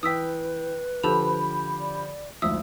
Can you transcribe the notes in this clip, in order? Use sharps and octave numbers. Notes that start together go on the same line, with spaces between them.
E3 B4 G5 D#6 E6 B6
D3 F3 G4 A4 A5 B5 F7
D5
G#1 D2 F3 E5 D#6 E6